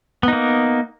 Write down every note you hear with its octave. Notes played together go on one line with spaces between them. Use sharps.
A#3 B3 D#4